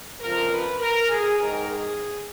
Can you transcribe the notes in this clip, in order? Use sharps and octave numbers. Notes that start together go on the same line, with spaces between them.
F2 C#3 F3 A#4
B4
A#4
G#4
G#2 D#3 A#4
G#4